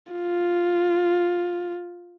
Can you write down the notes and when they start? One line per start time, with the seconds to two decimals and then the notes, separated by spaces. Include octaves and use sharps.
0.13 F4